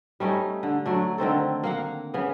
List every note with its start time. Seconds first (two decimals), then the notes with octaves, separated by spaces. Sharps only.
0.20 G3 A3 C#4 D#4
0.63 D3
0.86 F#3 A3 D4
1.18 D3 D#3 C4 A4
1.63 A#3 F5 F#5
2.14 C#3 B3